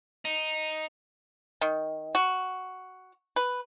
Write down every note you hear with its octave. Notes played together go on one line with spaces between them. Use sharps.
D#4
D#3
F#4
B4